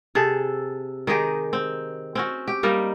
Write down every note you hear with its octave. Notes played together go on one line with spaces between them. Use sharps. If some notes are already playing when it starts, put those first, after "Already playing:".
C3 G#4 A4
D#3 D#4 G4 G#4
C4
C4 C#4 F#4
G4
G3 A#3 D#4